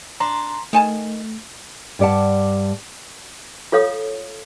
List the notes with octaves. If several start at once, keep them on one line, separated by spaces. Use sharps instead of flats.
D4 A#5 C6
D#3 A3 G#5 A5
G2 G3 D5 F#5 A5
F4 A4 C#5 F5 D#6